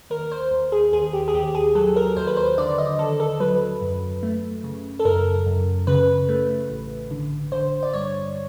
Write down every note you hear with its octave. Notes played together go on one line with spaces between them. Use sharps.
D#2 A#4
C5
D#2
G#4
D#2 G#4
G4
G#4
D#2 G4
G#4
F#3 A4
A#4
D#2 C5
B4
C5
D3 D5
D#5
D#2 A4
A4
F#3 B4
F#2
A3
C#3
A4
F#2 A#4
F#2
C#3 B4
A3
A1
D3
D3 C5
D5
G2 C#5